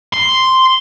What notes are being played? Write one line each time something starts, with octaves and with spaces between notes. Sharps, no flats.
C6